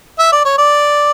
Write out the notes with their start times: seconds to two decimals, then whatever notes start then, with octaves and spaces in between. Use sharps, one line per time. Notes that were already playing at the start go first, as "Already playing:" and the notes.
0.19 E5
0.32 D5
0.45 C#5
0.58 D5